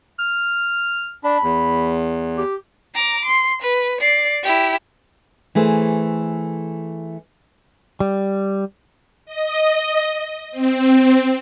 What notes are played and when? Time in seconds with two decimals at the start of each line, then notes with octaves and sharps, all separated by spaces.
0.19 F6
1.24 D4 B5
1.43 E2
2.37 G4
2.95 A#5 D6
3.25 C6
3.62 B4
4.01 D5 C7
4.43 E4 G4
5.55 E3 A3 G#4 C5
8.00 G3
9.26 D#5
10.51 C4